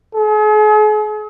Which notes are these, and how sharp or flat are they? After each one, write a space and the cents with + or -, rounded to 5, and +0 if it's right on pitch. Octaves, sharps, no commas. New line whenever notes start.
G#4 +40